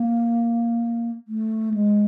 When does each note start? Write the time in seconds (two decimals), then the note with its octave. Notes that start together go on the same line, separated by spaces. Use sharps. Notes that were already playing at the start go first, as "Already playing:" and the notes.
Already playing: A#3
1.28 A3
1.74 G#3